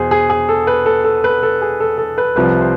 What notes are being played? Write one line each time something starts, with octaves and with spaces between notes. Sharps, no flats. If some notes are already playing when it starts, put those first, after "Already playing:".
Already playing: E2 B2 G#4 C5
G#4
G#4
A4
B4
A4
A4
B4
A4
G#4
A4
A4
B4
C2 C3 F3 B4
C5